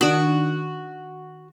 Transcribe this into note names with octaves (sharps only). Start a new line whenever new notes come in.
D#3 D4 F#4